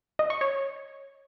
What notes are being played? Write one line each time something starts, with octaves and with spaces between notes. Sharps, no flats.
D#5
C#6
C#5